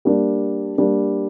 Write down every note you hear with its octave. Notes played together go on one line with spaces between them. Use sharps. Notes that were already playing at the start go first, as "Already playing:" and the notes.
G3 A#3 D4
G3 A#3 D4